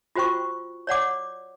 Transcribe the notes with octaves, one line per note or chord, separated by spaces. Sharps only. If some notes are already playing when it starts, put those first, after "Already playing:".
F4 F#4 C5 G5 C#6
C#5 D5 F#5 D6